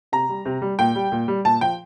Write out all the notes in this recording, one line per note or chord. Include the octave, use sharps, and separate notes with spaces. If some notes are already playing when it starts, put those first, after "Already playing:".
C3 A#5
G3
C3
G3
A#2 G5
G3
A#2
G3
A#2 A5
F3 G5